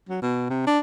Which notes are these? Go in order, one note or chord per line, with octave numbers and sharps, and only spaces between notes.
F#3
B2
C3
D4